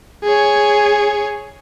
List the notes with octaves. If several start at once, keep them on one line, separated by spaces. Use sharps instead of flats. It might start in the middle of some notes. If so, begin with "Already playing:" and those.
G#4 C#5